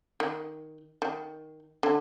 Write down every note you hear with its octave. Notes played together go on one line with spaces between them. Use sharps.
D#3
D#3
D3